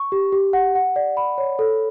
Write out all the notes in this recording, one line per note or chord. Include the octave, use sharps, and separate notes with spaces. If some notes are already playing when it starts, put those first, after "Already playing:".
Already playing: C#6
G4
G4
F#5
F#5
D5
B5
C#5
A4